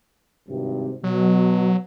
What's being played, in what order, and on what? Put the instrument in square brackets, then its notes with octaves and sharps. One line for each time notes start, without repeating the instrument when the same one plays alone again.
[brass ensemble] G#1 G2 C3
[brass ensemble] B2 [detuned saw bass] F#3